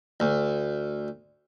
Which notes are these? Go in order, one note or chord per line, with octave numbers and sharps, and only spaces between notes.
D2